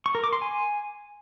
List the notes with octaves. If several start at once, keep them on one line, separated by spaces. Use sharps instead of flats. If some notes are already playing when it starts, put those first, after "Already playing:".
C#6
A#4
D6
C6
G#5